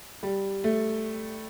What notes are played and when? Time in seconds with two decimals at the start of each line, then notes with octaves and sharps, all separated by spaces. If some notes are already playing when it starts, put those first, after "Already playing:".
0.23 G3
0.64 A3